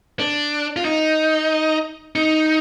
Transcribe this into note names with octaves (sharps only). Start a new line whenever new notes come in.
D4
F4
D#4
D#4